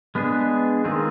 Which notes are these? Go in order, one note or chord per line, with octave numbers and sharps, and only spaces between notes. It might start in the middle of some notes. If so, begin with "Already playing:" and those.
G#3 B3 D4 G#4
D#3 G#3 C4 F4 G#4